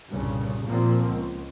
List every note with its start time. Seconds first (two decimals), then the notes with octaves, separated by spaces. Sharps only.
0.11 C2 G2 A#2 C#3
0.67 A#2 F3 A#3 C4
1.06 C#2